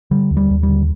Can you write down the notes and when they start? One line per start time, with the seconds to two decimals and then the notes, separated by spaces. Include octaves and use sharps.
0.11 D3 G3
0.31 D#2
0.37 G3
0.50 D#2
0.63 G3
0.68 D3